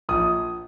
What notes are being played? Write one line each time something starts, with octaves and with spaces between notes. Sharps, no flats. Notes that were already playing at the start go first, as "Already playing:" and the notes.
A#1 D#6